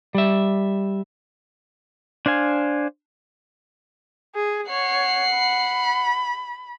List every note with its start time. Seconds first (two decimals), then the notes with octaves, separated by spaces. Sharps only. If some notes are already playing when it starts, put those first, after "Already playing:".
0.15 G3 E5
2.26 D4 C5 F5 G#5
4.35 G#4
4.70 C#5 F#5 C7
5.35 B5